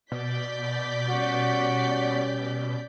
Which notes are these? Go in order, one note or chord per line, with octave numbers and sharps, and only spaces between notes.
B2 D5 G6 B6
G3 C#4 F#4